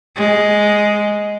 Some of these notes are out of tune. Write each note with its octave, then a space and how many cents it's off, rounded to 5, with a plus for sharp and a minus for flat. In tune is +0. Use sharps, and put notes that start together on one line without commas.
G#3 +5